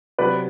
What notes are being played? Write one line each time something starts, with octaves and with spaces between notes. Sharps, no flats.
C3 F#3 B3 B4 D5